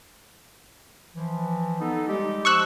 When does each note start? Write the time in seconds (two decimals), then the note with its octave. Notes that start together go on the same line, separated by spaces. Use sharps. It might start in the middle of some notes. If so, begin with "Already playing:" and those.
1.15 E3 F3
1.80 B3 D#4 A4
2.08 G3 G#3 G4
2.45 F3 C#6 E6 F#6